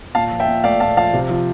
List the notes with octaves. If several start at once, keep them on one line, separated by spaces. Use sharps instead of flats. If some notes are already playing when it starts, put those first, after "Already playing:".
A#2 F5 A5
F3
E5 G5
A#2
A3 D5 F5
A#2 F5 A5
F3 F5 A5
C3
F3